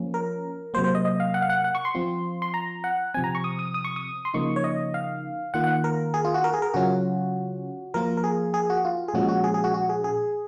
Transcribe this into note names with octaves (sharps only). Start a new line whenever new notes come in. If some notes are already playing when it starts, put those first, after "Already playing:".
Already playing: F3 A#3 C#4
A#4
C3 F#3 A#3 C5
C5
D#5
D#5
F5
F#5
F5
F#5
F#5
C#6
C6
F3 C4 F4
C6
A#5
F#5
C3 F3 C4 G#5
A#5
C#6
D#6
D#6
D#6
C#6
D#6
C6
C#3 F3 A#3 D#4 C#6
C#5
D#5
F5
D#3 A#3 F4 F#5
F#5
A#4
G#4
F4
F#4
A#4
G#4
A#4
C#3 F#3 C#4 F4 F#4
F3 A#3 F4 A#4
A#4
G#4
G#4
F#4
F4
G#4
A#2 F3 G#3 C#4 F#4
F#4
G#4
G#4
F#4
F#4
G#4
G#4